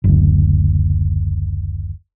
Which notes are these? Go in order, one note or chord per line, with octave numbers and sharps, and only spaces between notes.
F#1 D2